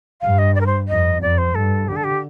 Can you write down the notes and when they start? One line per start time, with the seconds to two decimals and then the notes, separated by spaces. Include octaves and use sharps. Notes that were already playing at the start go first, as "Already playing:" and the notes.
0.21 G2 F5
0.38 D#5
0.55 D5
0.61 A#4
0.66 C5
0.88 F2 D#5
1.21 F2 D5
1.38 C5
1.55 G2 A4
1.88 D3 G4
1.96 A4
2.04 G4